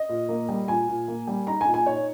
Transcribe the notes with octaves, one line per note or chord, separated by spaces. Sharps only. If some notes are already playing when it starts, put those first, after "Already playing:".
Already playing: D#5
A#2
A#3
G3
A#2 G#5
A#2
A#3
G3
D#4 A#5
G#5
A#2
G#5
D#4 C#5